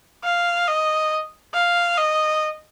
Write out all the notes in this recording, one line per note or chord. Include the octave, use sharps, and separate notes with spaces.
F5
D#5
F5
D#5